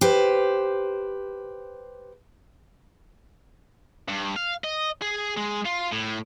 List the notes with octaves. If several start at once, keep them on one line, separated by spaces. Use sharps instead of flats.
G4 B4 C5
G2
F5
D#5
G#4
G#3
F4
A2